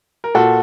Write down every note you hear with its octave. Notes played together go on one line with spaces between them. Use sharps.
A#4
A#2 F#4 A4